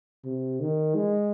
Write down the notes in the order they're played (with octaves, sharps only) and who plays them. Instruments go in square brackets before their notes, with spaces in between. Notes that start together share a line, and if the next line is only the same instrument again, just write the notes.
[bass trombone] C3
D#3
G#3